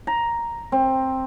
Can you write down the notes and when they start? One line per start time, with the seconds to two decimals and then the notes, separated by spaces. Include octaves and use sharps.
0.07 A#5
0.72 C4